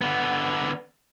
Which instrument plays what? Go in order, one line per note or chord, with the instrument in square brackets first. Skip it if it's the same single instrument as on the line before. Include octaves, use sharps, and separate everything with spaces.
[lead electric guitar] D3 B3